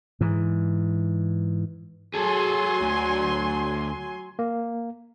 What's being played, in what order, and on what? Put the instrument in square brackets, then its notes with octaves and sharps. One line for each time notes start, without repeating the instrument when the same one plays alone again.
[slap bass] G#2 E3
[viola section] F#3 G#5 C6 [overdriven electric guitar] G#4 A4
[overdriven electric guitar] D2
[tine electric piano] A#3